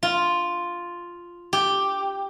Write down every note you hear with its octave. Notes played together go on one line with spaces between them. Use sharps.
F4
G4